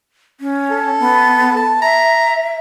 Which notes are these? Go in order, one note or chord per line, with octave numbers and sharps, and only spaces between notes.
C#4
A4
B3
A5
E5 A#5